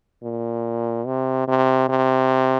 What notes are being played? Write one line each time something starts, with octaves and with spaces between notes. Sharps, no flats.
A#2
C3
C3
C3